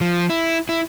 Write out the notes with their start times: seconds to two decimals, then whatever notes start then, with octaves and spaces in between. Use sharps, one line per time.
0.01 F3
0.30 E4
0.69 E4